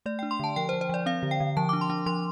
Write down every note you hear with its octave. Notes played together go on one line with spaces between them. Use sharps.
A3 D5
G5
D4
C6
D3 A5
F3 G5
C5
F3
C5
F3 D5
C4 F5
D3
G5
D3
F3 A5
D6
D4
C6
D4
F3 C6